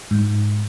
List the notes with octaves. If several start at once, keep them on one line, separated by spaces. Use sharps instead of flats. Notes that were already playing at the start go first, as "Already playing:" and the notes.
G#2